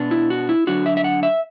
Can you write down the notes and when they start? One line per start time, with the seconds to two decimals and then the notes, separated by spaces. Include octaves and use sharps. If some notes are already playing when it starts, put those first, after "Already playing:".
Already playing: B2 B3 D4
0.11 E4
0.30 F#4
0.49 E4
0.67 D3 F#3 D4 F#4
0.86 E5
0.97 E5
1.04 F#5
1.23 E5